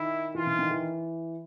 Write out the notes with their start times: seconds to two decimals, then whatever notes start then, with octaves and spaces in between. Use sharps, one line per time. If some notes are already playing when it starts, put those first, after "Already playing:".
Already playing: D#3 E4
0.35 E3 F4
0.47 D#3
0.59 D#3
0.71 E3